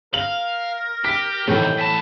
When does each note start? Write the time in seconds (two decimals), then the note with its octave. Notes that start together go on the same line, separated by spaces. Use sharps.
0.14 A#4 F5 F#7
1.05 G4 B6
1.48 A2 C3 D#3 E3 G5
1.78 E2 A5 B5